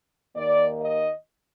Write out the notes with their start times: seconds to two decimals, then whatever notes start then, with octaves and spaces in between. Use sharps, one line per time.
0.36 D#2 D#3 A#3 D5
0.80 D#5